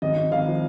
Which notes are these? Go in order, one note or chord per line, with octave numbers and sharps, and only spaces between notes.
G#1 D#5
G#1
G#1 F5
F3